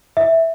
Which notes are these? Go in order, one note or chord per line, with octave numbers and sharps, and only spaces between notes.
E5